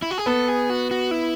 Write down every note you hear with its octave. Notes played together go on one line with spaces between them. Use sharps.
E4
F#4
G#4
B3 A4
G#4
F#4
F#4
E4